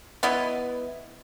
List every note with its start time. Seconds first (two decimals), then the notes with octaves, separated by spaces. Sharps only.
0.23 B3 E4 D#5